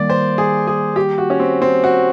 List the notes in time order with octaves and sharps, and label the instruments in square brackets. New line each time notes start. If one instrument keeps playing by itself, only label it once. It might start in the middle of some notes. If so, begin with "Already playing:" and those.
Already playing: [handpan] D#3 G3 A#3 [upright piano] D5
[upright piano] C5
G#4
G#4
G4
F#4
C#4
C4
C4
F#4